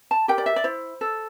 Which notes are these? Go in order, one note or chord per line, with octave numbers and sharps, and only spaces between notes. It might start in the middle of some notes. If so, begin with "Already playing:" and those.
A5
G4 A#4 G5
D5
E5
D5
E4 C5
A4